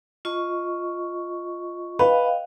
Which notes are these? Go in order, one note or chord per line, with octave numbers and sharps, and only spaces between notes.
F4 D#5 C#6
B4 D#5 F5 G5